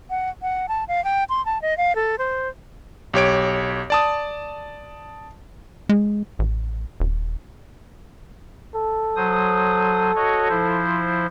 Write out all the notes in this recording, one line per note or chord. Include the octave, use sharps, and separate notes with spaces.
F#5
F#5
A5
F5
G5
C6
A5
D#5
F5
A4
C5
B1 G4 C#5 D7
D5 A5 D#6
G#3
A1
D#1
A4
F#3 C5 D#6
F#4 C#5 D#5
F3 E4 C5